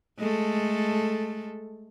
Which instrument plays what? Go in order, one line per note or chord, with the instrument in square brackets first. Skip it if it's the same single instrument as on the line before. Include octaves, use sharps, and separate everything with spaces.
[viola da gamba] G#3 A3 A4